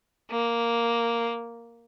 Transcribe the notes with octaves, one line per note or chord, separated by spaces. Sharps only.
A#3